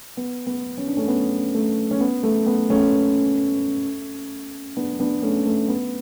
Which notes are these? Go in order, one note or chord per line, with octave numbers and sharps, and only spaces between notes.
B3
B3
C#4
D4
A3 C#4
B3
A3
C#4
B3
A3
B3
A3 C#4
B3 D4
B3 D4
A3 C#4
A3
B3